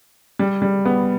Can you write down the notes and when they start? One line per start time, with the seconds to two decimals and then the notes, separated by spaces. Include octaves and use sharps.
0.39 G3
0.62 G3
0.85 B3